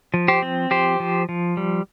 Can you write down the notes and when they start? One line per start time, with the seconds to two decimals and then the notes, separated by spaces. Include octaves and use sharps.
0.14 F3
0.28 G4 C5
0.42 C4
0.71 F3 G4 C5
1.00 F3
1.29 F3
1.57 G3